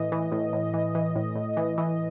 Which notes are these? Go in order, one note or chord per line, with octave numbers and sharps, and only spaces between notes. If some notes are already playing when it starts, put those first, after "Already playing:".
Already playing: A2 E3 D#5
E3
A2
A2
E3
E3
A2
A2
E3
E3